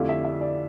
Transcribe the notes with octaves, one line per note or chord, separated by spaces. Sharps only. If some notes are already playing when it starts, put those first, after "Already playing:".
Already playing: F2 D3 A3 E4 G4 F5
E5
E5
D5